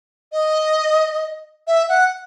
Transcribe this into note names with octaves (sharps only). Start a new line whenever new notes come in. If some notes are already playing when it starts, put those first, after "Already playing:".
D#5
E5
F#5